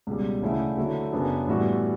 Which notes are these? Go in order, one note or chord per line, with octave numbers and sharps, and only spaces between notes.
C#2 B2 G3
D2 C#3 E3 A3 E4
D3 F#3 A3 E4
F#2 C#3 F#3 B3 D4
A2 E3 G3 B3 F#4